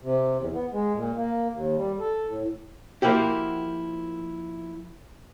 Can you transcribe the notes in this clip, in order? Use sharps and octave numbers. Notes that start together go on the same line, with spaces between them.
C3
E2
B3
G#3
A#2
A#3
D#2
G3
A4
A2
F3 A#3 E4 F#4 G4